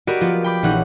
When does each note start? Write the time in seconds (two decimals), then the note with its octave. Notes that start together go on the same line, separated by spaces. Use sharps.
0.07 F#4 G4 A#4 D5 D#5 B5
0.21 F3 B3 F4
0.44 G5 B5 D6
0.63 A#1 E3 C#4 D#4 F#5